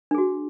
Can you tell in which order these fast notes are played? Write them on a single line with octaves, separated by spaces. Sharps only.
D4 G#4 F#4